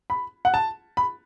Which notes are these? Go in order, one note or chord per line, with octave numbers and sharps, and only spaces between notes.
B5
F#5
A5
B5